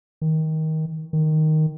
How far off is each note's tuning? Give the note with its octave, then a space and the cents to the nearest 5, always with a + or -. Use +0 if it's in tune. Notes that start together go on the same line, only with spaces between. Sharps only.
D#3 +20
D#3 +0